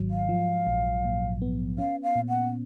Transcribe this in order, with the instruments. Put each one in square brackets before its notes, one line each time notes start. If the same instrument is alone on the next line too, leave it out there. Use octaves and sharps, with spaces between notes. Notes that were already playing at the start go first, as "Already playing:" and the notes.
Already playing: [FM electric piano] G#1 G#2 D#3 F#3
[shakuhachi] F5
[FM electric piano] F3
A#1
A#2
B3
[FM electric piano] C#4 [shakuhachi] F5
[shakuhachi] F5
[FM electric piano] A#2
[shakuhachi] F#5